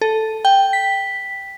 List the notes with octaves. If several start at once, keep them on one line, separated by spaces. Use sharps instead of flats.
A4
G5
B6